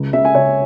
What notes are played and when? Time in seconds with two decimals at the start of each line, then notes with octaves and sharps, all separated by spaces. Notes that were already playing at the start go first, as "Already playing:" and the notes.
Already playing: C#2
0.13 C#3 E5
0.25 G#5
0.35 C#3 C#5